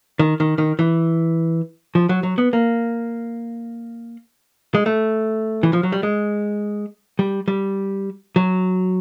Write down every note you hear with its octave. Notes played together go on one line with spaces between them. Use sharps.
D#3
D#3
D#3
E3
F3
F#3
F#3
B3
A#3
G#3
A3
E3
F3
F#3
G3
G#3
G3
G3
F#3